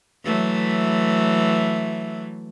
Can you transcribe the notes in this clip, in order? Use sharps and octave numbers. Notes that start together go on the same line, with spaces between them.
E3 F#3 A3